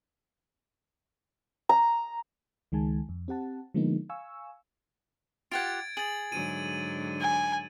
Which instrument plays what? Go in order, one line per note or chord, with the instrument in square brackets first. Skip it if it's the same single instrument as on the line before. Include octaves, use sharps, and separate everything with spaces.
[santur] A#5
[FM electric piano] C#2 D#3 G#3 G#5 A5
F2
C4 G4 F#5 A5
D3 F3 G#3 A#3 B3 D#4
F5 G#5 C#6 E6
[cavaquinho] F4 G4 F#5 [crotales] G#6 A6 D7
[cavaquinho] G#4 [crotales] A6 F#7
[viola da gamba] G#2 D3 F#3 [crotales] D#7
[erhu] G#5